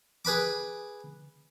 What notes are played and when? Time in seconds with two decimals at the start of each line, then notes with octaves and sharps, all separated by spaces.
0.25 G#4 B4 B5 D6